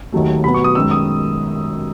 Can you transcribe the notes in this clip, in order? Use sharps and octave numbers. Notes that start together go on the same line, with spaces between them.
D#2 D#3 F#3 A3
B2 F#3 B3 B5
C#6
D#6
F#2 D#3 G#3 E6
D#6